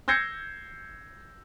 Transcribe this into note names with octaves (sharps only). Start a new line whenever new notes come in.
E6 G6 G#6 A#6 C7 C#7